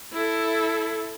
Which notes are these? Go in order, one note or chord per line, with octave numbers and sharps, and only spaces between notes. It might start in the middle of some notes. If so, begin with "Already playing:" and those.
E4 A4